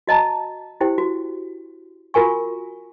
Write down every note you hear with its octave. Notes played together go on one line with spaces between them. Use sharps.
F#4 D#5 A5 A#5
E4 G4 C5 G5
F#4
F4 F#4 A#4 G#5 C#6